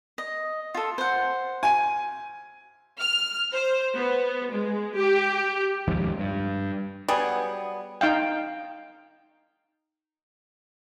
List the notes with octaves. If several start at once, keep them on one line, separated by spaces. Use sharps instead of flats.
D#5
F4 A4
C5 F#5
G#5 D#7
F6
C5
B3
G#3
G4
D#1 D#2 G#2 F3
G2
F#3 G3 B3 G#4
D#4 F5 G5